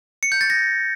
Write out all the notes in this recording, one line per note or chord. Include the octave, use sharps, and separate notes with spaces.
C#7
G6
A6
A#6